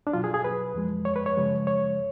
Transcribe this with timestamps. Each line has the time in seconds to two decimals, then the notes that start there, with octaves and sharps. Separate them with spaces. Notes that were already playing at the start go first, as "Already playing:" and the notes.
0.07 D4
0.13 B2 F#3 F4
0.24 G#4
0.34 G#4
0.44 B4
0.75 F2 F3 G#3
1.05 C#5
1.16 B4
1.26 C#5
1.37 F#2 C#3 F3 G#3
1.67 C#5